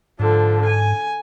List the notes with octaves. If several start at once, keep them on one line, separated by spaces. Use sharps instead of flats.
G#2 D3 F3
G#5